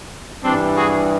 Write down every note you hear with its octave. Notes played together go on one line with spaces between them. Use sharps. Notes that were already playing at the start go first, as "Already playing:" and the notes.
G2 E3 G3 C4 D4
F#4 G#4